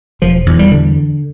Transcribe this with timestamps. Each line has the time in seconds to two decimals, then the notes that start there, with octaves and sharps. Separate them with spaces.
0.22 E1 F3
0.46 E2
0.59 G3
0.72 D3